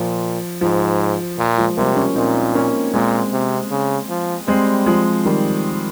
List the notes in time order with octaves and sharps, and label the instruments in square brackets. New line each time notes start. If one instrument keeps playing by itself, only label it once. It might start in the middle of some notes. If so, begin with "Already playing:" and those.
Already playing: [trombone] A#2 [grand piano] F3
[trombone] G#2 [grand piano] F3
[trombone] A#2
[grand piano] F3 G#3
[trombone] C3 [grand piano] G3 A#3
[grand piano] A#3 C#4
[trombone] A#2 [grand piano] C4 D#4
[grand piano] A#3 C#4
[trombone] A#2 [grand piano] G#3 C4
[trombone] C3
C#3
F3
[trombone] G3 [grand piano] G#3 C4
[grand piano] F3 G#3
D#3 G3